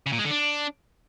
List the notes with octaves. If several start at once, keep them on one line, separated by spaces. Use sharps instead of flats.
C#3
A#2
G#3
D3
D4